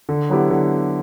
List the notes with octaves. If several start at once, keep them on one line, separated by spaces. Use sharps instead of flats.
D3
F#3 B3 E4 G4
D3